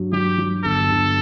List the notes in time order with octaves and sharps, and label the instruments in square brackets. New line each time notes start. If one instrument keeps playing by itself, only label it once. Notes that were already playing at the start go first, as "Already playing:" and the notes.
Already playing: [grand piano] G2 F#3
[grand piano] F#3 [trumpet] G4
[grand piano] F#3
[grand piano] G1 [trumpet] A4
[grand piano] G1